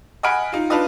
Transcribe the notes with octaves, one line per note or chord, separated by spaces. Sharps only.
D#5 F#5 G#5 B5 F6 D7
D#4 F4
D4 D#4 F4 B4 D#5